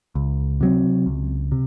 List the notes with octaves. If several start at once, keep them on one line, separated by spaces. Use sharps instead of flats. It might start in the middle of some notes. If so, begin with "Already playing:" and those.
C#2
C3 F#3 C4
C#2
C3